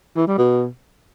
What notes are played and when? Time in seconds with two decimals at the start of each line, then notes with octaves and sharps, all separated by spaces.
0.16 E3
0.27 G3
0.38 B2